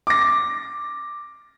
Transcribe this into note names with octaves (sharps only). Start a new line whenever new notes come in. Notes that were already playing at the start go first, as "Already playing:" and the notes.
D6 A#6